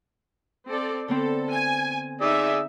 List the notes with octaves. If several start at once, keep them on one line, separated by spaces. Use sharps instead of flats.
C4 A4 D5
D3 B3 C4 A4
G#5
D#4 G#4 D5 E5 E6